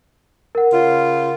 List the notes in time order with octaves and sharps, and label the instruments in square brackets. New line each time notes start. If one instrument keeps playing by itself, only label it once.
[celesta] A#4 F#5
[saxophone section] C#3 F4